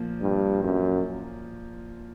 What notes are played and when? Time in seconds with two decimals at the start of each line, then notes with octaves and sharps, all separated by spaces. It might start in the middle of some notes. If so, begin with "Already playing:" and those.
Already playing: A#2 F3 A#3
0.21 G2
0.63 F#2